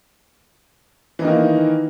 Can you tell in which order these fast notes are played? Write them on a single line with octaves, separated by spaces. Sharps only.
E3 D#4 D#3 A#3